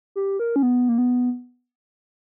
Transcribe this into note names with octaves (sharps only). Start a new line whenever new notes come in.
G4
A#4
C#4
B3
A#3
B3